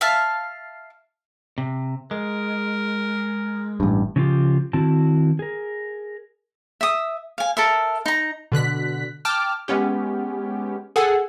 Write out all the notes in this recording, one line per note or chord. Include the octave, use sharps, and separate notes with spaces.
E5 F5 A5 F6
C3
G#3 A#4
A1 G2
C#3 F3 A3 A#3 F4 G4
D#3 C4 E4 F#4 A5
G#4 A#4
E5 D#6
F5 G#5
A4 A#4 E5
D#4 A#5
B2 D3 F#6 B6
G5 A5 D6 F6
G#3 B3 C#4 G4
G#4 A4 F#5 G#5